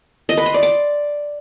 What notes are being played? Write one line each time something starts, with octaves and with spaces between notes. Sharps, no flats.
D#5
B4
C6
D5
D6